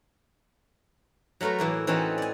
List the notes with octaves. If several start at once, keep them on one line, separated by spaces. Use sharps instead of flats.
F#3 A3 A#4 B4 C#5
A2 E3 A#3 F#4
E3 C4 C#4 D#4 F#4 A4
D5 G#5